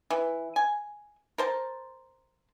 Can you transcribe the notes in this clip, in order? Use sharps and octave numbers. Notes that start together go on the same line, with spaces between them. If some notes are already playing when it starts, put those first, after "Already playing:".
E3
G#5
A#4 C5 A5